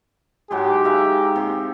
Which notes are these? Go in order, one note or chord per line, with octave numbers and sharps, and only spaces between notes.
G#2 F#3 G#3 G4
D#4 E5 F5
C3 G4